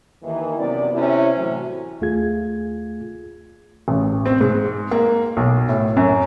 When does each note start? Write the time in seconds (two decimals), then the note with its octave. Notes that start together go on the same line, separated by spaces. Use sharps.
0.23 D#2 D#3 E3
0.58 F#2 C3 B3 D5
0.93 C3 C#4 E4
1.37 A2 C3 E3 F#3
2.01 D#2 A3 F4 G#4 G#6
3.88 A1
4.26 C4
4.41 G#2
4.91 A#3
5.37 B1
5.69 A2
5.97 F#2